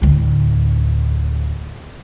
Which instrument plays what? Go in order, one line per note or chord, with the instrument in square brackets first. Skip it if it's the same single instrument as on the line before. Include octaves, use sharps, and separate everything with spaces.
[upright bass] D2 A2